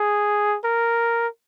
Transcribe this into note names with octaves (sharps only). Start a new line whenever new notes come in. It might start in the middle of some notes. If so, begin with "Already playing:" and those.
Already playing: G#4
A#4